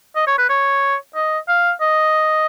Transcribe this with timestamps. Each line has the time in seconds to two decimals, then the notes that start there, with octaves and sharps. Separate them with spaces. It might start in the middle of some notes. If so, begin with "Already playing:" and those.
0.16 D#5
0.27 C#5
0.38 B4
0.49 C#5
1.15 D#5
1.49 F5
1.81 D#5